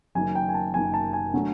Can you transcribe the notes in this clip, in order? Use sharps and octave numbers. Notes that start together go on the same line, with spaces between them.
F#1 F#2 D#3 G#5
G5
G#5
A5
F#1 F#2 D#3 G#5
A5
G#5
D3 F#3 A3